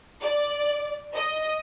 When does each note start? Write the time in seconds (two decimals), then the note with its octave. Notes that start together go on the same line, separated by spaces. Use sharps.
0.22 D5
1.14 D#5